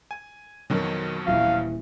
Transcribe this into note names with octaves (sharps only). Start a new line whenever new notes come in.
G#5
F2 B2 D#3 F#3
D#1 E3 F5